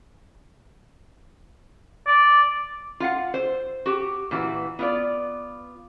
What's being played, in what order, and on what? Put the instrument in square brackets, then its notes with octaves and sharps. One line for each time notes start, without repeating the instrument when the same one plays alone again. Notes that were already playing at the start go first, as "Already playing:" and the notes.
[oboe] D5
[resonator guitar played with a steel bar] F4 F5 F#5
C5
F#4 G4
A#2 E3 F#4 B4
B3 F4 D5